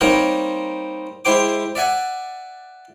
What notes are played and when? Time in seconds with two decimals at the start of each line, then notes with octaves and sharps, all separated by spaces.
0.01 G3 A#3 C4 D#4 A#4 C#5
1.25 G#3 E4 G4 C5 G5 D6
1.75 D5 E5 F#5 G#5